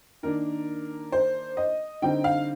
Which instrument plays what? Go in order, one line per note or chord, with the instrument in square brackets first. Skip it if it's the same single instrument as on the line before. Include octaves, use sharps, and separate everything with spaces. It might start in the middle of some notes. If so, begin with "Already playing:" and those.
[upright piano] D#3 A#3 D4 A#4
C5
D#5
D3 G3 C4 D#4 G5
F5